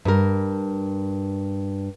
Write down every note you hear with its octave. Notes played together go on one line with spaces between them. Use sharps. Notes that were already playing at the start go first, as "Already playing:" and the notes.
G2 A#4